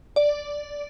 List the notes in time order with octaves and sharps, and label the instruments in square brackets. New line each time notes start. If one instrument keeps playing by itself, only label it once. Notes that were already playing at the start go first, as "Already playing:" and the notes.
[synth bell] D5